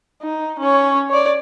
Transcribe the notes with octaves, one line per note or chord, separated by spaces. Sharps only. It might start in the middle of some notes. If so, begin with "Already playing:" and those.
D#4
C#4 C#5
C#5 D5